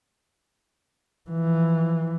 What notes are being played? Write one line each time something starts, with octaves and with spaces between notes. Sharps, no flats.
E3 F3